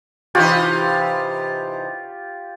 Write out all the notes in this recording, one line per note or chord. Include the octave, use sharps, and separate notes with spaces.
C3 E3 D#4 F4 G4 C#5